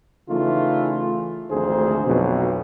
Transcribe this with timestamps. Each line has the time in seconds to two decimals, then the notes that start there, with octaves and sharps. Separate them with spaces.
0.29 C#3 E3 A3 D#4 F4
1.50 G#1 D2 F3 G#4 C5
2.06 B1 F2 B2